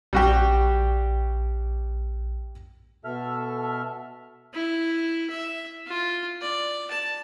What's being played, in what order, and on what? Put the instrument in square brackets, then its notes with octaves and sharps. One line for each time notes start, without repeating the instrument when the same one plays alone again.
[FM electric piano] A#1 [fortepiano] G3 F#4 G4
[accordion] B2 A4 E5 F6
[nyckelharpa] E4
E5
F4
D5
A5